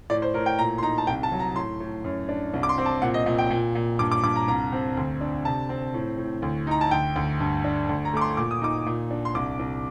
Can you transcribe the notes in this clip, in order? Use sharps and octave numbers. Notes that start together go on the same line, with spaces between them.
A2 D5
C5
A2 A#4
G5
A#2 A#5
C6
D#4 A#5
A5
C2 G5
A5
F#3
A#5
A2 C6
A2
F#2
D4
C2
D6
C6
C4
A5
A#2 F#5
D#5
A#2
G5
A#2
A#2
G2 D6
D6
G2 D6
A#5
C2 A#5
C4
D2
D4
C3 A5
C4
A2
A2
D2
D#4 A#5
A5
D2 G5
D2
G2
D4
D2
A#5
A3 D6
C6
A#2 D6
D#6
D#4 D6
A#2
D4
C6
C2 D6
C2